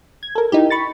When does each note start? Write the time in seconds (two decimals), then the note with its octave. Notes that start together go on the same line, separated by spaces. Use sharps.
0.23 G#6
0.35 A4 A#4
0.52 D#4 E4 G4
0.70 B5 C#6 A6